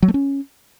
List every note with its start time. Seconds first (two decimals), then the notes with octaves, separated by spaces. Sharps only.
0.02 F#3
0.08 A3
0.14 C#4